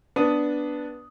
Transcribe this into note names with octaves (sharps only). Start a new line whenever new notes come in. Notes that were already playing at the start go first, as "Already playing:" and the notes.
B3 D4 D#6